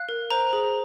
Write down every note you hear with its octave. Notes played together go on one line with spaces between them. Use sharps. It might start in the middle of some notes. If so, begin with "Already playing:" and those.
Already playing: F5 F#6
A#4
C5 A#5
G#4